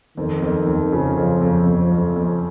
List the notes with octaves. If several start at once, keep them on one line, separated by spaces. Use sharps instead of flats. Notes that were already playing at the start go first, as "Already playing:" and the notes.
F2 D#3
F2
F2
C#3 F3
F2
F2
F2
F2
F2